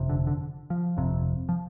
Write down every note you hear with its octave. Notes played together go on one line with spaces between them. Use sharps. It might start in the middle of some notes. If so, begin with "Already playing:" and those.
Already playing: G1 F2 C3
D3
D3
F3
G1 F2 C3
F3